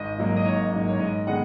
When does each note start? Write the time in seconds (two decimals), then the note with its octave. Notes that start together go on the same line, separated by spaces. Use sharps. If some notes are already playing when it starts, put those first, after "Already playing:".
Already playing: G#1 D#5
0.18 G#2 F#3 A#3
0.36 D#5
0.45 G#1 C#5
0.72 G#2 F#3 A#3
0.88 C#5
1.00 G#2 D#5
1.27 D#3 G#3 B3 D#4 D#5 F#5